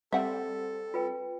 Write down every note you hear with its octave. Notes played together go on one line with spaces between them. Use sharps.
G3 C4 A4 E5 F#5
F4 B4 G5